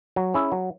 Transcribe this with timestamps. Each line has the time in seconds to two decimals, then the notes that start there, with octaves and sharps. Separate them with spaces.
0.16 F#3
0.34 C#4 E4 G#4
0.52 F#3